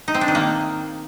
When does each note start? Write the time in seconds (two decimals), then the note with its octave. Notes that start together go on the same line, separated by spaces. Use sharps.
0.08 D#4
0.14 C4
0.21 D4
0.28 D#3
0.35 A#3